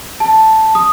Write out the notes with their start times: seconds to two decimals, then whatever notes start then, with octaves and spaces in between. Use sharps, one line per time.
0.20 A5
0.75 D#6